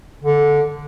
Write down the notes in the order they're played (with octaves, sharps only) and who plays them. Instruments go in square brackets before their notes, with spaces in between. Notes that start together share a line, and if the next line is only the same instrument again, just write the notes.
[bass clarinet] D3